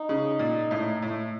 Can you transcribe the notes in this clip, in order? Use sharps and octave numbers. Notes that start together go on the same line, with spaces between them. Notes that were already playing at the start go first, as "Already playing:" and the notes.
Already playing: D#4
C#3
A#2
A2
A2